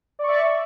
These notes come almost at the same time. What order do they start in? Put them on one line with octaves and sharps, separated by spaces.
D5 C#6 E5